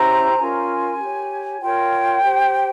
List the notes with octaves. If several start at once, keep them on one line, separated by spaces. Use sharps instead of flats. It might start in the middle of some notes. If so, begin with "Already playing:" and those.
Already playing: C#4 E4 G4 C5 A#5
G5
C#4 F4 A#4 G#5
G4 C#5
F4 A#4 C#5 G5
G4 C5